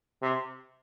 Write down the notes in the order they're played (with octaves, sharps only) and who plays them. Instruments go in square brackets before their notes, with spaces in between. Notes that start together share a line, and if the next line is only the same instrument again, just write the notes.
[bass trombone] C3